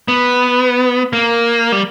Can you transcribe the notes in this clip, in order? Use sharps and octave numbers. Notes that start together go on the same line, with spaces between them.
B3
A#3
G3